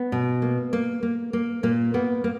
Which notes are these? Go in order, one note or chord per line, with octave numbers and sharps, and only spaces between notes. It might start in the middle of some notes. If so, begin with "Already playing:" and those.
Already playing: B3
B2
A#3
A#3
A#3
A#3
A#2 A#3
A#3 B3
A#3